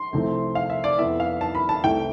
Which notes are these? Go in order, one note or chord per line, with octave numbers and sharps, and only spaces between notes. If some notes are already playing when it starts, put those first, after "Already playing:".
Already playing: C6
C2 C3 F3 A3 C4
F5
E5
D5
F2 E3 B3 E5
F5
A5
B5
A5
C2 C3 E3 A3 G5